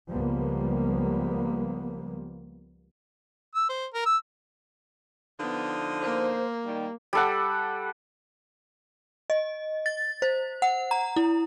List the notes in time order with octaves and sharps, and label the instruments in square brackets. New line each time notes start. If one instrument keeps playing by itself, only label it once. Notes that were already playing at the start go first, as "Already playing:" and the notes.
[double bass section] C#2 F3 G3 A#3 B3
[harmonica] E6
C5
A#4
E6
[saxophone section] D3 F3 D#4 [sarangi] B3
[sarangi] A#3 [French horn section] C5
[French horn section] D#3 G3
[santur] G3 A4 F#5
[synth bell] D#5
A6
C5
F#5
A#5
E4